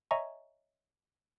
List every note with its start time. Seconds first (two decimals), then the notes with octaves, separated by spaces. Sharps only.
0.11 C#5 D#5 E5 G#5 A#5 C#6